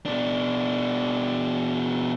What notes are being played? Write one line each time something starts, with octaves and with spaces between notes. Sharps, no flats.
B2 D4